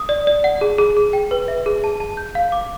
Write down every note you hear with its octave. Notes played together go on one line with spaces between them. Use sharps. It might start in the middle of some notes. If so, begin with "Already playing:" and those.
Already playing: D#6
D5
D5
F#5
G#4
G#4
G#4
G5
B4
E5
G#4
A5
A5
G6
F5
D6